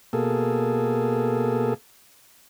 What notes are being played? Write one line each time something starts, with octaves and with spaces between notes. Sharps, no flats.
B2 A#3 G#4 A4